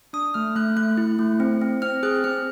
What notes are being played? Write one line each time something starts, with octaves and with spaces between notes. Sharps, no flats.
D4 D#6
A3 F6
A3 F#6
A3 F#6
E4
A3
C4
C4
C4 F6
G#4 F#6
C4 F6